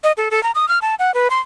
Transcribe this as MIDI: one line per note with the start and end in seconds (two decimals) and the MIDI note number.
0.04 0.12 75
0.17 0.29 69
0.31 0.42 69
0.43 0.51 82
0.55 0.68 87
0.68 0.79 89
0.82 0.95 81
0.99 1.14 78
1.14 1.28 71
1.30 1.40 84